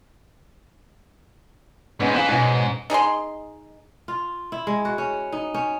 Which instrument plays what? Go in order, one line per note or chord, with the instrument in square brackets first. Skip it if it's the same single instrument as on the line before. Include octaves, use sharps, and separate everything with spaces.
[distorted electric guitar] G#2 [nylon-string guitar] G#3 B3 C#4
[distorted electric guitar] E3 [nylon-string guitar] D#4 F5 G#5
[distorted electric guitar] G#2 [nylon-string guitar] B2 C#4 G#5
[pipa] D#4 G#4 D#5 C6
[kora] F4
E4
G#3
F#4
C#4
D#4
C#4